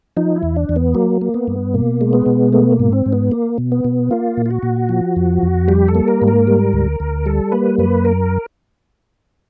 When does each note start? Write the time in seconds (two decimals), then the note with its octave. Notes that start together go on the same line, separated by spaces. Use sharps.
0.17 F3 D#4
0.36 E4
0.43 E2
0.56 D4
0.69 E2
0.76 B3
0.95 F#3 A#3
1.22 A#3
1.34 B3
1.47 G2
1.74 B2 A#3
2.01 G#3
2.13 B3
2.26 B2
2.53 A3 B3
2.72 A#3
2.80 G#2
2.92 C4
3.06 G#2
3.13 B3
3.32 A#3
3.58 B2
3.72 B3
3.84 B2
4.11 A#3 F4
4.37 A#2
4.46 F4
4.51 F#4
4.63 A#2
4.89 F3
5.16 F2
5.42 F2
5.68 G3 G4
5.88 A4
5.95 A#3
6.08 A#4
6.22 G#2
6.28 A#4
6.47 G3
6.73 D2
7.00 D2
7.26 G3 A4
7.52 A#3 B4
7.78 F#2 B4
8.05 A#4